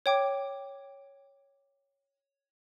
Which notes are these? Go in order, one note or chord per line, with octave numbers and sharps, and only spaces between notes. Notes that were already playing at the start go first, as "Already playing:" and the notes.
C#5 G5 D6